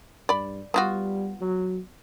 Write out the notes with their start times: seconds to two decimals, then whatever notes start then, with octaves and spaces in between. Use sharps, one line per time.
0.29 G2 D5 B5
0.74 G3 B3 F4 F#4
1.41 F#3